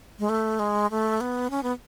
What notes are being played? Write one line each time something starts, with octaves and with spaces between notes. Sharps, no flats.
G#3
A3
G#3
A3
B3
C#4
B3